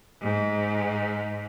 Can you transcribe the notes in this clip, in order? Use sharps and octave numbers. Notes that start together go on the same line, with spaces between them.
G#2